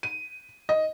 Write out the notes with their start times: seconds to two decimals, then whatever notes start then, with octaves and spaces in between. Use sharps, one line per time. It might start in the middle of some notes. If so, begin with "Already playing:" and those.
0.03 D#7
0.69 D#5